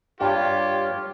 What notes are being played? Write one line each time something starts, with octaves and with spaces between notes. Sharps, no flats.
G2 G3 F4 G4 C#5